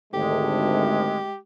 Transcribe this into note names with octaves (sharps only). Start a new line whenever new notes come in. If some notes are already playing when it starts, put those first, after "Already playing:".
G#1 D2 G#3 A3 G4